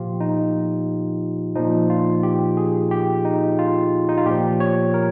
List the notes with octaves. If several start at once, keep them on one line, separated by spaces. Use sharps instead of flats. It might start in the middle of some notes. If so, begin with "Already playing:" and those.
Already playing: A#2 F3 F4 G4
D#4
A#2 F3 D#4
F4
G4
G#4
G4
D#4
F4
D#4
F4
A#2 F3 G4
C#5
A#4